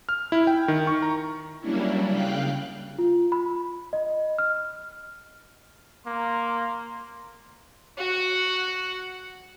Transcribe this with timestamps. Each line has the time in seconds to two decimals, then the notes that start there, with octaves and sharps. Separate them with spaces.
0.09 F6
0.32 E4
0.47 G5
0.68 D#3
0.87 C#6
1.02 A#5
1.60 F#3 G3 A#3 C#4 D4 E4
2.08 C#3 F5 G5 F#6
2.99 F4
3.32 B5
3.93 D#5
4.39 F6
6.07 A#3 A#5 C6
7.98 F#4 F#5